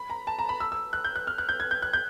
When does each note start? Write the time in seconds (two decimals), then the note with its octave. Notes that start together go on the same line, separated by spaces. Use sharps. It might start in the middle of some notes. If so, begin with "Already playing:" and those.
Already playing: B5
0.10 A#5
0.27 A5
0.39 A#5
0.49 B5
0.60 E6
0.72 E6
0.93 F#6
1.04 G6
1.16 F#6
1.27 F6
1.38 F#6
1.49 G6
1.60 G#6
1.71 G6
1.82 F#6
1.93 G6